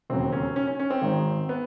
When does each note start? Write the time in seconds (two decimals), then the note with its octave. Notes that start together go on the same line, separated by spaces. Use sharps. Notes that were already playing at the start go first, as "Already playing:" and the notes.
0.10 E1 D#2 C#3 F#3 C4
0.32 C#4
0.56 C#4
0.67 C#4
0.79 C#4
0.90 C4
1.02 G#1 G#2 D#3
1.49 B3